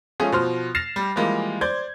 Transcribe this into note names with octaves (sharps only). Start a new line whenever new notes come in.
F3 G#3 A3 C#4 F4 G#4
B2 F3 C5 C6 F6
F6 A6 A#6 C7 E7 F7
G3
E3 F3 G3 G#3 A#3
C5 D5 C6 G6 G#6